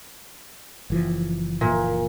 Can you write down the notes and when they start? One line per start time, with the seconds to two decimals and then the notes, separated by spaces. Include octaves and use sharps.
0.90 F#1 E3 F3
1.61 A#2